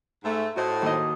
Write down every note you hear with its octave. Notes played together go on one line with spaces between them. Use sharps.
G#2 A3
A2 F#4 C5 D#5
D#2 D#5